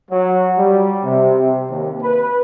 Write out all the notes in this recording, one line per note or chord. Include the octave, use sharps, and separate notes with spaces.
F#3
G3
C3
D#2
B4